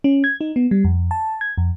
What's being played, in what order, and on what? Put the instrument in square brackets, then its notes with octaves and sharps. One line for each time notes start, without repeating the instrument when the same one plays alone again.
[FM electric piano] C#4
G#6
D#4
B3
G3
F2
A5
G#6
F2